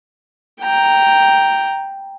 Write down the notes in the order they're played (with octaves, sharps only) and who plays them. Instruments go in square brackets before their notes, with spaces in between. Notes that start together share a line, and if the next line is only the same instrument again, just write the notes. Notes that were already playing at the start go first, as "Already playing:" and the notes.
[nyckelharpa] G5 A#5